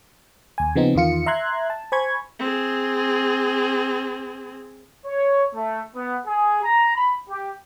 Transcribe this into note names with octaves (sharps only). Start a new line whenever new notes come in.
D#2 G#5
C#3 F3 B3 C4 D#4
E2 D#3 F4 C#7
E5 A#5 C6 F#6 G#6
A5
C5 G#5 B5 C#6 G#6
C4 G#4
C#5
A3
B3
G#4
A#5
B5
G4